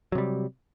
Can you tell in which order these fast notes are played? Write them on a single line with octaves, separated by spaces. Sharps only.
F#3 C3 G3